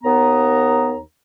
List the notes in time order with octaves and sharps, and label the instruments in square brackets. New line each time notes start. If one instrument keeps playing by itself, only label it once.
[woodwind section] D#2 B3 A#5